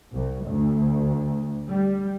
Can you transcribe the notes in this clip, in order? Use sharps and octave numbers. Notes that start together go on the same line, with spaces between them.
C2
D2
G3